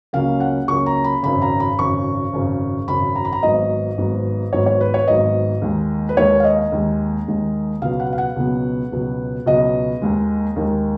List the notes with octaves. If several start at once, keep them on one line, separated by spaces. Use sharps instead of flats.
C#2 C#3 F#3 A#3 C#4 F5
F#5
C#2 C#3 F#3 A#3 C#4 C#6
A#5
B5
G#1 F#2 C#3 B5
A#5
B5
G#1 F#2 C#3 C#6
G#1 F#2 C#3
G#1 F#2 C#3 B5
A#5
B5
A#5
G#1 G#2 F#3 B3 D#5
G#1 G#2 F#3 B3
G#1 G#2 F#3 B3 C#5
C#5
B4
C#5
G#1 G#2 F#3 B3 D#5
D#2 D#3 G#3
B4
D#2 D#3 G#3 C#5
F5
D#5
D#2 D#3 G#3
D#2 D#3 G#3
C#2 B2 F#3 B3 F5
F#5
F5
F#5
C#2 B2 F#3 B3
C#2 B2 F#3 B3
C#2 B2 F#3 B3 D#5
D#2 D#3 G#3
D#2 D#3 G#3